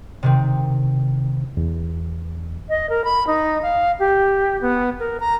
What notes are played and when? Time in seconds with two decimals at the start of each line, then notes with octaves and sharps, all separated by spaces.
0.23 C3 D#3 C4
1.57 E2
2.69 D#5
2.89 A#4
3.04 B5
3.27 D#4
3.62 F5
3.99 G4
4.61 B3
5.00 A#4
5.20 A#5